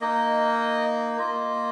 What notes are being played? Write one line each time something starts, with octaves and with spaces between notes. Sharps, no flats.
A#3 D#4 D#5
A#3 F4 D#5